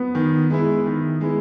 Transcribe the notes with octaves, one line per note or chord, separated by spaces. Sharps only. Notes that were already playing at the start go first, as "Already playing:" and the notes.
Already playing: B3
D#3
G#3 B3 E4
D#3
G#3 B3 E4